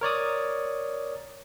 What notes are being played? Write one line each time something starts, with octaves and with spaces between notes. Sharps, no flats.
A#4 C#5 D5 D#6